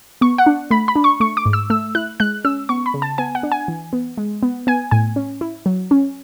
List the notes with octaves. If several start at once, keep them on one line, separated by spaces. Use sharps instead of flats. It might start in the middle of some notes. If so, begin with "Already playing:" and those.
B3 C#6
F#5
D4
A3 B5
B5
D4
C#6
A3 C#6
D6
G#2
E6
A3 E6
E4 F#6
G#3 F#6
C#4 E6
B3 C#6
B5
C#3
A5
B3 G#5
F#5
D4
G#5
E3
B3
G#3
B3
B3 G#5
A2 G#5
C#4
E4
F#3
C#4